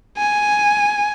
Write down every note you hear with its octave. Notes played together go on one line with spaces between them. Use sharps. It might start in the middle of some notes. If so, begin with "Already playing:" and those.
G#5